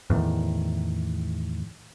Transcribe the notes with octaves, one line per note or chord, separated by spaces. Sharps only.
E2 A2 D#3